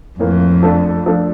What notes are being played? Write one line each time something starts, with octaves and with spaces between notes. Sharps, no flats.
F2 A2 E3 A#3
F3 A3 D4 A4
F3 A3 D4 A4